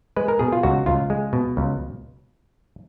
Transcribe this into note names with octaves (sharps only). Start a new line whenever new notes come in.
G#3 B4
A#4
B2 G#4
F4
C#2 F#4
C#2 F4
G#3
B2
C#2